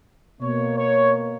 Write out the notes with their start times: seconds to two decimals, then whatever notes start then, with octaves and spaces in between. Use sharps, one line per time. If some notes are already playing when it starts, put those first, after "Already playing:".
0.41 B2 A#3 C#5
0.77 C#5